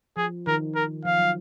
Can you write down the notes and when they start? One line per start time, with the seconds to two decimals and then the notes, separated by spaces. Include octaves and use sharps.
0.17 F3 G#4
0.47 D#3 A#4
0.75 A#4
1.05 F3 F5
1.19 F#3